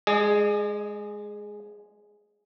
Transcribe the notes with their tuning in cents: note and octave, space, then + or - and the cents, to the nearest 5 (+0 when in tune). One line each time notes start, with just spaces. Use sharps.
G#3 +0 G#4 +0 D#5 -45